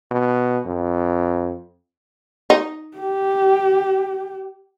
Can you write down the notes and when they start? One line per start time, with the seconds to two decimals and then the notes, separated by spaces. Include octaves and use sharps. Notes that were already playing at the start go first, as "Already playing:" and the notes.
0.11 B2
0.66 F2
2.50 D#4
2.98 G4